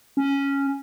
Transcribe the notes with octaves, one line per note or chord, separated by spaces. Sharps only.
C#4